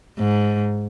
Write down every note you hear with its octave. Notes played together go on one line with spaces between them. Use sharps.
G#2